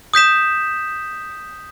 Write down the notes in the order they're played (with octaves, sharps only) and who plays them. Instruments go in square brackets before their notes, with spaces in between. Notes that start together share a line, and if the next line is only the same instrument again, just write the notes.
[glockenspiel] D#6 G6 B6 E7